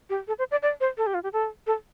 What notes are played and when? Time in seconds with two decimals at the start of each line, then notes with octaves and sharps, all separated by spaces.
0.09 G4
0.28 A4
0.38 C5
0.51 D5
0.62 D5
0.80 C5
0.97 A4
1.06 G4
1.14 F4
1.23 G4
1.33 A4
1.67 A4